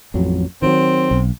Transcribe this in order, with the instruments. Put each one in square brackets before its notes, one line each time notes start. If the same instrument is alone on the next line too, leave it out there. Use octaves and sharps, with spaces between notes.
[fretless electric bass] A1 F2 F#3
[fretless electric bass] D#3 F3 F#3 [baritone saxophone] C4
[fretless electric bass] B1